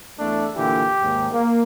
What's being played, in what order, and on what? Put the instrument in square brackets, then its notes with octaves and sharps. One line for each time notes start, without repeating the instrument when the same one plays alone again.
[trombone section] E2 A3 D4
[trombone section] A#2 D3 E3 [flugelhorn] G4
[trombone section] D#2 G#2
A#3